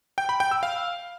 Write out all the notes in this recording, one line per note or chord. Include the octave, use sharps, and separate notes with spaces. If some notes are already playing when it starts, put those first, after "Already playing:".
G5
B5
G5
E6
F5